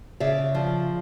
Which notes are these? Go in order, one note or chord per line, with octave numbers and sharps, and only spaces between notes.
C#3 D5 E5
F3